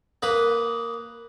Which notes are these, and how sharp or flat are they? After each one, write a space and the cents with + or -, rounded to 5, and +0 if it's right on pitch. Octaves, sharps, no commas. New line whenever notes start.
A#3 -5 B4 +0 D#6 +0